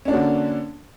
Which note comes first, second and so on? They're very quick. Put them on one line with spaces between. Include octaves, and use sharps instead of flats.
C#4 D4 A#3 F#4 D3